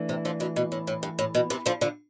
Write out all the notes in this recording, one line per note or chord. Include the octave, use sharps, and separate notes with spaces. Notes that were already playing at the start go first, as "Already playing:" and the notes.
Already playing: E3 A3 D4
C3
D3 F3
B2 D3
B2
A2
A2
G2
A2
B2
C3 E3
D3 F3
D3 F3